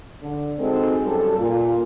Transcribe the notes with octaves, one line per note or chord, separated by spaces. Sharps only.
D3
G#3 C4 D#4 F#4 A4
F#2 G3 A4
A#2 F4